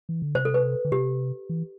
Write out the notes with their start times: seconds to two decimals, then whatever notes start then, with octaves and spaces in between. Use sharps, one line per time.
0.09 E3
0.22 D3
0.35 C3 C5
0.45 A4
0.54 B4
0.85 D3
0.92 C3 G4
1.49 E3